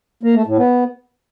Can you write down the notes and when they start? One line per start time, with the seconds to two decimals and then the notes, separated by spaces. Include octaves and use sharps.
0.23 A#3
0.35 A3
0.46 A2
0.58 B3